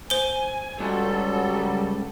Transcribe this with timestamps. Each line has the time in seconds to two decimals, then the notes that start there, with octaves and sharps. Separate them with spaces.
0.10 C5 G#5 G7
0.80 C#2 F#3 G3 A4